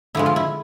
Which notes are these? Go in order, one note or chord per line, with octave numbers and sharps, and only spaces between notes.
D3 F3 G#3 E4
F4
E4